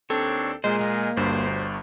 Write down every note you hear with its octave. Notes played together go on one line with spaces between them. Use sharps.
D#2 C4 D4 A4 C#5
A#2 G#3 C5 D#5
A#3
G1 D2 G2 C5